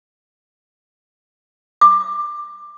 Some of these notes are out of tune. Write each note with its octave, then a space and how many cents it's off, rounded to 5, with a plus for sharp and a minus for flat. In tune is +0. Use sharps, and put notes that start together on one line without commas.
D6 +15